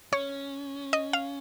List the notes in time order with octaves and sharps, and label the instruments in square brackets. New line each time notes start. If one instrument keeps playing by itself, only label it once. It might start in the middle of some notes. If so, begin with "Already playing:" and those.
[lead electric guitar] C#4 [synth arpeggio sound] C#5
[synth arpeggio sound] D#5
F5